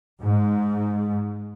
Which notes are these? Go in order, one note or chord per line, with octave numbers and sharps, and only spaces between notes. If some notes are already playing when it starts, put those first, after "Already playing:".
G#2